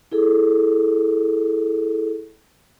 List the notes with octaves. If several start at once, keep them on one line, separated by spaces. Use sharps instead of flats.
E4 G#4 A4